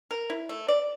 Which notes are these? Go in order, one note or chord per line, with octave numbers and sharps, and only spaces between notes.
A#4
E4
A3
D5